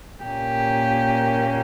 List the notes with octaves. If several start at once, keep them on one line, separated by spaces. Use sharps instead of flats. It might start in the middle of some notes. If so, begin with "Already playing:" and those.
A#2 A#3 C#4 G4